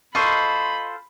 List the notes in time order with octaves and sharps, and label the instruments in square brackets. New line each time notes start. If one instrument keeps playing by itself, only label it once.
[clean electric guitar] F4 A4 C5 [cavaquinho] D#5 C#6 [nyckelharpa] B5